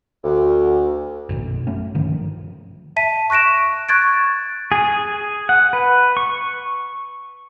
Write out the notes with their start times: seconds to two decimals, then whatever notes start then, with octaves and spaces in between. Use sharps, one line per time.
0.24 D2
1.29 A#1 F#2 B2
1.67 F#3 A3 C#4
1.95 G2 D3 D#3 F3
2.96 E5 A5 B6 D#7
3.30 C#6 F#6 A#6 D7 E7
3.89 C#6 F#6 G#6 A6 D7
4.72 G#4
5.49 F#5
5.73 B4
6.17 C#6